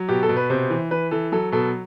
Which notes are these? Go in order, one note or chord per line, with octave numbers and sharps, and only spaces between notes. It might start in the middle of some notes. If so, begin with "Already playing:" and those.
Already playing: F#3
B2 G4
A4
B2
B4
C3 C5
E3
E3 B4
E3 A4
F#3 A4
B2 A4